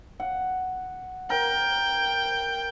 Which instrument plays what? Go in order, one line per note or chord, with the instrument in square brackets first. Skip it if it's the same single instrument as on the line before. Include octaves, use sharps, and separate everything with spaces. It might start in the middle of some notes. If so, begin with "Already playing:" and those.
[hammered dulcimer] F#5
[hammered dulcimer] A#4 [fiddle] G5